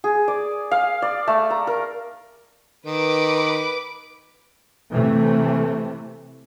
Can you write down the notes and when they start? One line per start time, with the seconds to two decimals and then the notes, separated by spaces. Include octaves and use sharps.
0.04 G#4
0.28 D5
0.71 F5
1.02 D5
1.27 A3
1.50 A#5
1.67 A#4
2.86 D#3 B4 D6
4.93 C3 E3 A3